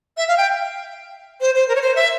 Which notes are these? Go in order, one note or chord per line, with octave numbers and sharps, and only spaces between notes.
E5
F5
G5
C5
C5
A#4
C#5
C5
E5